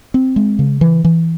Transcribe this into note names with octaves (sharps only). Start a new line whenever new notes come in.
C4
G#3
C#3
E3
E3